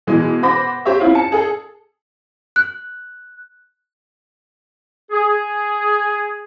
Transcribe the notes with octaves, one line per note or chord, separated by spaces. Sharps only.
B2 E3 G#3
B3 C5 B5 D6 A#6
G4 C5 C#5 E5
C4 C#4 E4 F4
A5 C#7
G#4 A4
F#6
G#4